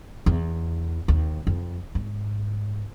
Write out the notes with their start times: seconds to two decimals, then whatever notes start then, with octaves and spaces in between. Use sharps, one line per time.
0.26 E2
1.08 D#2
1.47 F2
1.95 G#2